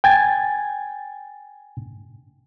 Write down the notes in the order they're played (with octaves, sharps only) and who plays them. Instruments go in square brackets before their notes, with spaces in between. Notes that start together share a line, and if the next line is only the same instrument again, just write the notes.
[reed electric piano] G5 G#5 G#6 A6